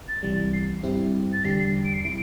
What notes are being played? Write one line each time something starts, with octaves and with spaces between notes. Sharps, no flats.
A6
C2 C3 E3 G3
C7
G2 G3 C4 E4 G4
A6
E2 D3 G3 D4 G4 C7
C7
D7
C7
C3 G3 E4 D7